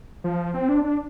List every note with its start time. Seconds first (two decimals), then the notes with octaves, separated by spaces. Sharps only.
0.24 F3
0.54 C4
0.69 D4
0.84 D4